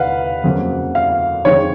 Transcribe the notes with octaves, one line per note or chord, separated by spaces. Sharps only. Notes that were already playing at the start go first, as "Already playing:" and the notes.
Already playing: D#2 B4 F5 F#5
F2 C#3 F#3 A#3
F5
F2 D#3 G#3 C#5